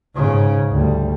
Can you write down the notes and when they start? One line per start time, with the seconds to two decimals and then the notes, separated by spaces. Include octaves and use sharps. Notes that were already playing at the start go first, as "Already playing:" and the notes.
0.15 G#2 C#3
0.68 D2 G3